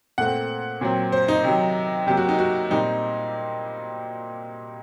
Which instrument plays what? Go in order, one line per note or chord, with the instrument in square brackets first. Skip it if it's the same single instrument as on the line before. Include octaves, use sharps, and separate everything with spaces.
[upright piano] A#2 A3 C4 F#5
A#2 F#3 C4
C5
D#4
C3 D#3 F#3
C3 F#3 A#3 G4
F#4
D#4
F#4
A#2 G3 C4 D#4